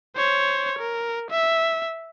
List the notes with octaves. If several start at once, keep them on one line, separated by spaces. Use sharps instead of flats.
C5 C#5
A#4
E5